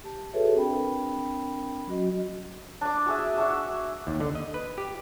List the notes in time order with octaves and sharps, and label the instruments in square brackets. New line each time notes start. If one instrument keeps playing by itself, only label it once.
[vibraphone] G4 A5
F#4 G#4 A4 B4 C#5 E5
C4 D4 A#4 G5 B5
F#3 C#4 F#4 D#5
[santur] D4 D6
F#4 G#4 E5
D4 F#4 E5
[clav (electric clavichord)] D#2
D3
D#5
B4
G4